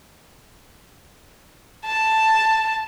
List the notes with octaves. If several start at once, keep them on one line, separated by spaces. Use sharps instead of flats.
A5